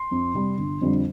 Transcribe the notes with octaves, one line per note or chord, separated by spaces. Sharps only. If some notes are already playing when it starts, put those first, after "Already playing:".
Already playing: C6
F2
C3 G3
G1
F2 D3 G3